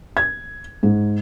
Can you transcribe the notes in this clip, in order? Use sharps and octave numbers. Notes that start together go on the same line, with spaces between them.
G#6
G#2